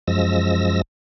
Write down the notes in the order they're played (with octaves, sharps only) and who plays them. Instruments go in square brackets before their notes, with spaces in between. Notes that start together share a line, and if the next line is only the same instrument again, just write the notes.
[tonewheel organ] F#2 F3 G#3 E6 A#6